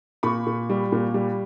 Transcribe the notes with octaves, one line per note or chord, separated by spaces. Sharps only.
A#2 B5 C#6
A#2
G3
A#2
G3